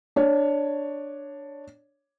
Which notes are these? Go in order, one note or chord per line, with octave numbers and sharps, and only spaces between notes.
D4 C#5